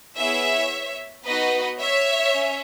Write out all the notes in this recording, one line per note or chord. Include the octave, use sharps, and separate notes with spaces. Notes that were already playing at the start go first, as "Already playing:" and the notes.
B3 E4 G#4 C#5 E5
B3 D#4 F#4 B4 D#5
C#5 E5
C#4